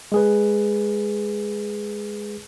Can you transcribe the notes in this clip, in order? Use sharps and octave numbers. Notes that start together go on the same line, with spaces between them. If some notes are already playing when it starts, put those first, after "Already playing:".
G#3 G#4 B4